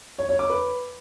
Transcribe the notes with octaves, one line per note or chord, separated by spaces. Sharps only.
C#5
C#5
D6
B4